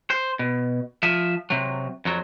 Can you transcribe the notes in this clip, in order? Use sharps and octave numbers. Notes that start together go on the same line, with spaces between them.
C5
B2
F3 E5
C3 F#3
F2 F#3